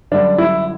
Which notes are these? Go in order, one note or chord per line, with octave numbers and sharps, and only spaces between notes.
F#2 D3 G3 D4
E4